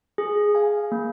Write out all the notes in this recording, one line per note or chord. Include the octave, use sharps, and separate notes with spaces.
G#4
F5 G#5
A#3